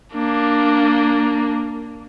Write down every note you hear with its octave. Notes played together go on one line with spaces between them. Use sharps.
A#3 D4